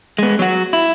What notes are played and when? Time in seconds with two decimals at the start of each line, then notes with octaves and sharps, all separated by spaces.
0.18 G#3 B3
0.39 F#3 F#4
0.73 E4